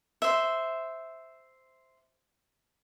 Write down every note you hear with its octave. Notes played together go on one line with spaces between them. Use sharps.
C5 E5